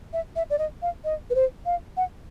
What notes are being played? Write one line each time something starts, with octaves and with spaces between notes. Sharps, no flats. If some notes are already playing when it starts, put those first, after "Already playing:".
E5
E5
D5
D#5
F5
D#5
B4
C5
F5
F#5